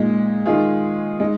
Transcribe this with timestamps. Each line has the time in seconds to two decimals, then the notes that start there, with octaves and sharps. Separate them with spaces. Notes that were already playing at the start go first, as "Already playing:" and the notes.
Already playing: A#2 G#3 D#4
0.46 D#3 G#3 F4 G#4
1.20 G#3 D#4